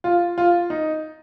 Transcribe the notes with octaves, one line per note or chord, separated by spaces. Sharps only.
F4
F4
D#4